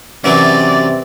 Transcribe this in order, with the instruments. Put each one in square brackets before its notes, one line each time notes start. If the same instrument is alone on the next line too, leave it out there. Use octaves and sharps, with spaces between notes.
[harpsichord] F#2 E3 F#3 [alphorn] C3 [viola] D5